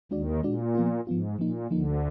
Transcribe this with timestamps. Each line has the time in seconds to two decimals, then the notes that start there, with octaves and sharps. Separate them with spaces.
0.11 D#2 D#3 G#3 D4 F#4 D5
0.43 A#2 G#3 D4 F#4 D5
0.75 F3 B3 F4
1.07 G#2 F3 B3 F4
1.38 A#2 F3 A#3 D#4
1.71 D2 D3 F3 A#3 D#4